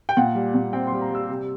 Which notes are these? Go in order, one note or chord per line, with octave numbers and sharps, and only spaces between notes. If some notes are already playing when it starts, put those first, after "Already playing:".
G5
A#2 F#5
G3
A#2
C4 G5
G3 C6
A#5
G3 E6
C3